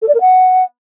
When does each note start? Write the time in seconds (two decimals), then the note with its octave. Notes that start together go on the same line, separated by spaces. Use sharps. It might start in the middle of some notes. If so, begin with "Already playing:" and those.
0.02 A4
0.08 D5
0.14 A#4
0.21 F#5